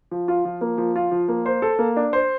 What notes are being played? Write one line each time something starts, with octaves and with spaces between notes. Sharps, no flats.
F3
F4
F3
A#3
F3
F4
F3
A#3
C5
A4
A#3
D4
C5